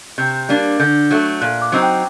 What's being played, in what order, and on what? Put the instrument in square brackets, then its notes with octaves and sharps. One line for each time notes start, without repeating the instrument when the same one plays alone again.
[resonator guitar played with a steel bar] C3 [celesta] G6
[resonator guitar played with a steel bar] G3 A#3 D4
[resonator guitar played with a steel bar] D3 [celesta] G6
[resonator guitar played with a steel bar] F#3 A3
[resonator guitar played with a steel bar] A#2 [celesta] F#6
[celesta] D6
[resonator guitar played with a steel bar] F#3 C4 D#4
[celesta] G5